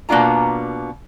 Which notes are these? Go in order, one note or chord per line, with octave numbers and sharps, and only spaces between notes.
B2 A#3 B3 D4 F4 A#5